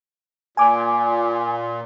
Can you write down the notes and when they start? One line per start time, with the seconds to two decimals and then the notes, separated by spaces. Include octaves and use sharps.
0.57 A#2 G#5 D6